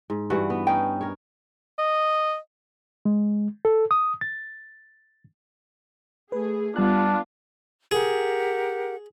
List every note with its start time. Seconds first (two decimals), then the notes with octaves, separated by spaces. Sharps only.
0.10 G#2
0.30 G2 E3 F#4 F#5
0.50 B3
0.67 C#4 D#4 C#5 G5
1.01 A#4 C#5
1.78 D#5
3.05 G#3
3.65 A4
3.91 D#6
4.21 A6
6.32 A3 G#4 B4
6.76 G3 B3 D4 F4 A5 F#6
7.91 G4 G#4 A#4 F#5